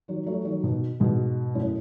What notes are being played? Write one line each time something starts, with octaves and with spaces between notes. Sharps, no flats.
D#3 F#3
F#3 A3
D#3 F#3
B2 D#3
G#2 B2
F#2 A2